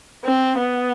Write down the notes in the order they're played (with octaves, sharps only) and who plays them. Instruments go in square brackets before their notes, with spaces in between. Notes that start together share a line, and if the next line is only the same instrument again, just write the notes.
[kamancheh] C4
B3